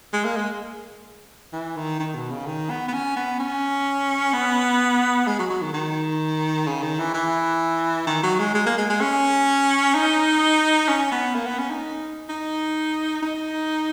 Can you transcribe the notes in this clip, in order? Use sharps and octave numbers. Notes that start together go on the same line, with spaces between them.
G#3
A#3
G#3
E3
D#3
D#3
B2
C#3
D#3
B3
B3
C#4
B3
C#4
B3
G#3
F#3
F#3
D#3
D#3
C#3
D#3
E3
E3
D#3
F#3
G#3
G#3
A#3
G#3
G#3
C#4
D#4
C#4
B3
A#3
B3
C#4
D#4
D#4
D#4